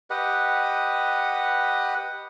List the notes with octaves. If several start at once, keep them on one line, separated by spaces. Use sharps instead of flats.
G4 B4 D#5 F#5